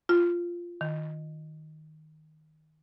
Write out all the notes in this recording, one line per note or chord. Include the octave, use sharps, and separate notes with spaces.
F4
D#3